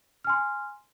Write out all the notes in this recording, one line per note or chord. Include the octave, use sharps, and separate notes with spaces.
G#5 C6 F6